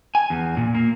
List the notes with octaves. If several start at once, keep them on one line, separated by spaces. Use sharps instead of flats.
G#5
E2
A#2
A#3